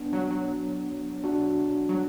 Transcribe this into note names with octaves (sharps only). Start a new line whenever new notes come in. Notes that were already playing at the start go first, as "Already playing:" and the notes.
Already playing: B3 D4
F#3
F#3
D4 F#4
F#3